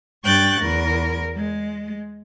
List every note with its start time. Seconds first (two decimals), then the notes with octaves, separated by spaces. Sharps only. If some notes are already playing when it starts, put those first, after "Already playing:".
0.23 G2 G5 C#6 F#6 A6
0.60 E2 A#4
1.35 G#3